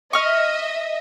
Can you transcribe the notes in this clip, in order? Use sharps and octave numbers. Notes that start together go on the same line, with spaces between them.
D#5 E5 C#6 F6